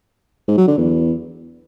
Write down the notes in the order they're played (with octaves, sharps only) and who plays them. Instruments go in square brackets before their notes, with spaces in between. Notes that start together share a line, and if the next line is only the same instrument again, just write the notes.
[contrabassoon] G#2
F#3
D3
E2